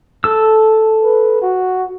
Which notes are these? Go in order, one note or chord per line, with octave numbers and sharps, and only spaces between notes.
A4 E6
B4
F#4